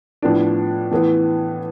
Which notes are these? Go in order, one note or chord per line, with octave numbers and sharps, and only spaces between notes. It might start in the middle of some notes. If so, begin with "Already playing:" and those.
A2 F3 B3 D4
A2 E3 B3